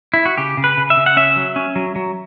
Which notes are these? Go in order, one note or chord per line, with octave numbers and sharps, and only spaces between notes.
E4
F#4
C#3 G4
C#3
B4
C#3
E5
C#3
F#5
C#4 E5
F#3
C#4
F#3
F#3